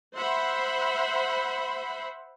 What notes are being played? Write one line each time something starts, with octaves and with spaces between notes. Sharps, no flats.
C5 E5 F#5 B5 C6